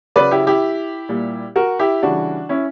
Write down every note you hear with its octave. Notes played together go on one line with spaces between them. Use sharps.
C#3 F#3 B4 D5
E4 G4
E4 G4
A#2 G3
F#4 A#4
E4 G4
C#3 E3 G3 D4 F#4
C#4 E4